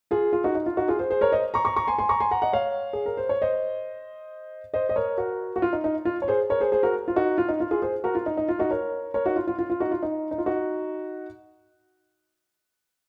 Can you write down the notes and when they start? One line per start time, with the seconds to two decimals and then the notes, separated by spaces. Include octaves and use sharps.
0.11 F4 G#4
0.33 F4
0.44 D#4 F#4
0.55 D#4
0.66 F4
0.77 D#4 F#4
0.88 F4 G#4
0.99 G#4 C5
1.10 G#4 C5
1.21 A#4 C#5
1.32 C5 D#5
1.54 A#5 C#6
1.65 A#5 C#6
1.76 A#5 C#6
1.87 G#5 C6
1.98 G#5 C6
2.09 A#5 C#6
2.20 G#5 C6
2.31 F#5 A#5
2.42 D#5 F#5
2.53 C#5 F5
2.93 G#4
3.06 A#4
3.17 C5
3.29 C#5
3.42 C5 D#5
4.74 C5 D#5
4.89 D#5
4.96 A#4 C#5
5.18 F#4 A#4
5.56 F#4
5.62 F4
5.73 D#4
5.84 D#4
6.05 F4
6.22 C#5
6.28 G#4 C5
6.50 A#4 C#5
6.61 G#4 C5
6.72 G#4 C5
6.83 F#4 A#4
7.08 F4
7.16 D#4 F#4
7.38 F4
7.49 D#4
7.60 F4
7.71 F4 G#4
7.82 G#4 C5
8.04 F#4 A#4
8.15 F4
8.26 D#4
8.37 D#4
8.49 F4
8.59 D#4 F#4
8.71 A#4 C#5
9.14 A#4 C#5
9.26 D#4 F#4
9.36 F4
9.47 F4
9.59 F4
9.70 F4
9.80 D#4 F#4
9.91 F4
10.03 D#4
10.31 D#4
10.38 F4
10.46 D#4 F#4